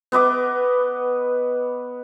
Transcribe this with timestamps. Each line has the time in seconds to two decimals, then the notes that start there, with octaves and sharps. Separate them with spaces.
0.12 B3 B4 D#5 D6